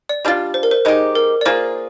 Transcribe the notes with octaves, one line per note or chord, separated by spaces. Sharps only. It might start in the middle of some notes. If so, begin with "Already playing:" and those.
D5
G3 D4 F4
C5
A#4
C5
G#3 D#4 G4 C5
A#4
D5
A#3 F4 G#4 C5